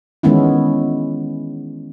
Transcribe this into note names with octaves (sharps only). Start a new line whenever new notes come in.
D#3 E3 G#3 B3 C#4 E4